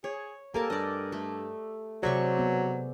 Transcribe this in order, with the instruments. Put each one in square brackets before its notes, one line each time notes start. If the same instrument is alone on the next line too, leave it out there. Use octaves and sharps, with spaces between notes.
[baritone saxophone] G#4 [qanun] C#5
[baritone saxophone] A#3 [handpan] G4 A4 [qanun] A#4 G#5 A5
[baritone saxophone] G2 [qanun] D5 D#5
[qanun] A3
[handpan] C3 G#4 D5 [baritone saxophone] F#3 [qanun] C5 E5 C#6
[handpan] B3